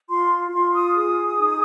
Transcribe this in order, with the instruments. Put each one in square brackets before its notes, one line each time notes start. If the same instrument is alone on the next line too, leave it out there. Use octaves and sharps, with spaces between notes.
[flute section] F4 C6
F4 C6
D#6
G#4 D#6
D#4